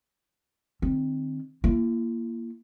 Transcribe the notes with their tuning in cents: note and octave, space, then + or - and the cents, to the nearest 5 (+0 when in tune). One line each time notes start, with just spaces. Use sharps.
D#3 -35 C4 +0
A#3 +0 E4 +45